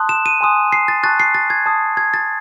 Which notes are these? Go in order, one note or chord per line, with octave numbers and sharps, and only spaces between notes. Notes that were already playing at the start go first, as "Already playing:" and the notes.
Already playing: A5 C6 D#6 F#6
E7
D#7
G#5 C6 D#6 F#6
C7
A6
A5 C#6 F#6 A6
C7
A6
G#6
A5 D#6 F#6
G#6
A6